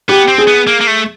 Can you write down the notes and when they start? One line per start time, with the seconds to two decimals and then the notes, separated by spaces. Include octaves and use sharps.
0.09 B3 G4
0.28 C4
0.38 G#4
0.47 B3
0.67 A#3
0.81 A#3
0.87 A3